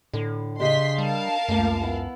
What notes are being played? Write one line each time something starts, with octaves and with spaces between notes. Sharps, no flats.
A2 D3
C#3 D4 G4 D#5 C6 B6
G3 A#4 F5 A5
C#2 F#2 A3 A#3
B3 E4